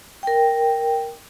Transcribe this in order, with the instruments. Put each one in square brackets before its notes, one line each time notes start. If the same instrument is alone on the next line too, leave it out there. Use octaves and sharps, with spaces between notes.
[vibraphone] A#4 G5